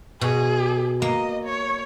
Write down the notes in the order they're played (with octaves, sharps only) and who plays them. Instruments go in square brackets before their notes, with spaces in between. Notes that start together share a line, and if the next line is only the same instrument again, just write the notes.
[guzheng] B2 [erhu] G#4
[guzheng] A#3 [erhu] D#5
[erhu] C#5